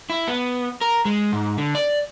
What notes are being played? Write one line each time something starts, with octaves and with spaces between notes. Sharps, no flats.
E4
B3
A#4
G#3
G#2
D3
D5